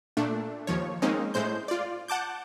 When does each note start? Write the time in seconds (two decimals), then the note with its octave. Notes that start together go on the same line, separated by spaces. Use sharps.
0.17 A#2 A3 D4
0.67 D#2 F3 C#5
1.02 G#3 A#3 C4 C#4 D#4
1.34 A2 G#3 C5 G6
1.68 F4 D5
2.08 F#5 A5 D6 G6